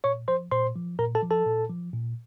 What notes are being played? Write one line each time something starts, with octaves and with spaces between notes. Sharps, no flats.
A#2 C#5 C#6
F3 C5 C6
A#2 C5 C6
F3
A#2 A#4 A#5
A4 A5
F3
A4 A5
A#2
F3
A#2